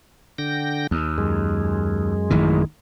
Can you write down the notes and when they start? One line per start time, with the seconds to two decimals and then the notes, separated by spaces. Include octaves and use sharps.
0.38 D3 G5 A#6
0.91 D#2
1.18 F#2 G#3
2.30 A1 D#3 E3